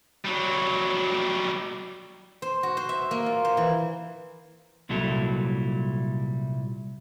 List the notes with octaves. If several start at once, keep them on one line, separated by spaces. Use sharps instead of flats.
F#3 G3
C5
F#4
C5
E5
A#3
F4
C5
E3
C2 A#2 F#3 G3 E4 A4